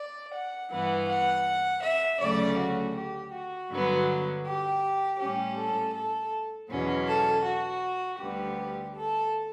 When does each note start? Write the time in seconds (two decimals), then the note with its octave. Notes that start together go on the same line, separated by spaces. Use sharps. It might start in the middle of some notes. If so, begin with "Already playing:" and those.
Already playing: D5
0.34 F#5
0.71 G2 E3 B3 F#5
1.09 F#5
1.83 E5
2.20 D2 C#3 F#3 A3 C#4 D5
2.58 F#4
2.95 G4
3.32 F#4
3.71 G2 D3 F#3 B3
4.45 G4
5.19 A2 G3 C#4 G4
5.57 A4
5.94 A4
6.70 E2 B2 F#3 C#4
7.07 A4
7.44 F#4
8.19 D2 D3 G3 B3 G4
8.94 A4